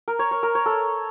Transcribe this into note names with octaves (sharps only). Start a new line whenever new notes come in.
A#4
C#5
C#5
A#4
C#5
A4